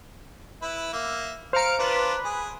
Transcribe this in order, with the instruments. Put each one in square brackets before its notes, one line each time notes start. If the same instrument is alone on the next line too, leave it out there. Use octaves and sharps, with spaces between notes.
[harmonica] E4 B4
A#3 E5
[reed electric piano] C5 A#5 [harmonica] F5 [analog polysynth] F6 C#7 D7
[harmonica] D4 F4 [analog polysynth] B4
[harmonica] G#4